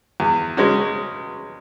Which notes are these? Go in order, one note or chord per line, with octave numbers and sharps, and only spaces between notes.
E2
C#3 G#3 C#4 F#4